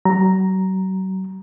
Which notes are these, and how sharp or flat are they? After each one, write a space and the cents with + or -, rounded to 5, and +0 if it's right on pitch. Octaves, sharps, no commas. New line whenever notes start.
F#3 +40 A#5 +0